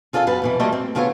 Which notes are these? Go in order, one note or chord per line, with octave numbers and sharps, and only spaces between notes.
C4 F4 G#4 A4 D#5 F5
F#2 B3 B4 A5
F2 B2 E3
G3 A3 A#3 F4 G4 D#5
C4
D2 C#3 B3 F4 A4 C#5